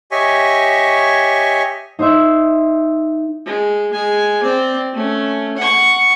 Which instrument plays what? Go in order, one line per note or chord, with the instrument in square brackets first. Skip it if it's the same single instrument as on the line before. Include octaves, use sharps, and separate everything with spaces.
[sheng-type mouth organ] G4 C#5 D#5 E5 G#5 C#6
[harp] D#4 C5 D#5 E5
[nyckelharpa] G#3
G#3 G#5
C4 D5
A3 C#4
F#5 C#6